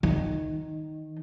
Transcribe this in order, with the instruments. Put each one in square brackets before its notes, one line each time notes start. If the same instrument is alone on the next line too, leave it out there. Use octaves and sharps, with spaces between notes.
[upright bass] D#3